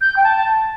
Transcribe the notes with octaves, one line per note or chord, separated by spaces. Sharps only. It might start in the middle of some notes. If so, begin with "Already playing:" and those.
G6
G5
A5